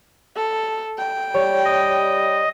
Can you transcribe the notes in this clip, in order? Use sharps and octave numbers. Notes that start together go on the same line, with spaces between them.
A4
G5
G3 C#5
D#5